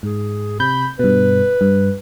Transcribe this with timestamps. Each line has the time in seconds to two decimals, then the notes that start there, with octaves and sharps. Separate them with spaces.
0.03 G#2 G#4
0.60 C3 B5 G6
0.99 G2 B2 B4
1.61 G2